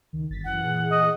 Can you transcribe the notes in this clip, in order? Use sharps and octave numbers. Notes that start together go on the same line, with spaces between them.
C#2 D#3
G1 A6 B6
F#2 E3 F#5
A#2 E3 G#4
D#5